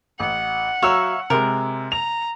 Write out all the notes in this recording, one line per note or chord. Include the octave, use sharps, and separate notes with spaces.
A1 F#5
F#3 C#5 E5 F5 A#5 E6
C3 G#3 A#4
A#5 F7